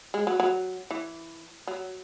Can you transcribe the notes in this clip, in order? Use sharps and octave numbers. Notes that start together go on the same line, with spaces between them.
G#3
F#3
F#3
E3
F#3